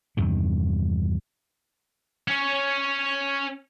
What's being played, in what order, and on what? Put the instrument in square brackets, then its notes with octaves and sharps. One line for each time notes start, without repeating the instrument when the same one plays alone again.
[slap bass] E2 G2 C3 D#3
[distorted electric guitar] C#4 C#5